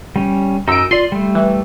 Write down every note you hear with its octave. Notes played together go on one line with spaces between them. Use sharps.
G3 C#4
F#2 D#4 E6 D7
F4 D5 C6
G3 A3
E3